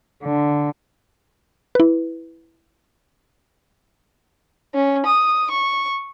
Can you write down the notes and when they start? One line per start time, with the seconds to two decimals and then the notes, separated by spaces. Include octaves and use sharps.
0.23 D3
1.75 E4 B4
4.73 C#4
5.04 D#6
5.50 C#6